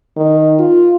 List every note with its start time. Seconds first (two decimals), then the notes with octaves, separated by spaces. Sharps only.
0.17 D#3
0.59 F4